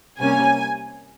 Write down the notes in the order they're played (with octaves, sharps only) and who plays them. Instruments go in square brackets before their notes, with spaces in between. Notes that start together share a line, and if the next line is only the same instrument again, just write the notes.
[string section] C3 G3 A#3 C#4 G#5